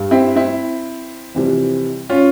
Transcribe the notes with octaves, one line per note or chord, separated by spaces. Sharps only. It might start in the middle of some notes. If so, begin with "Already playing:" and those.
Already playing: G2 G3
C4 E4
C4 E4
F2 C3 E3 G3
C#4 F4